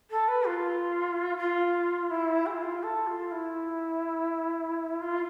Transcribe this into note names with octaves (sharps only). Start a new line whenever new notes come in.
A4
B4
F4
F4
E4
G#4
F4
A4
F4
E4
F4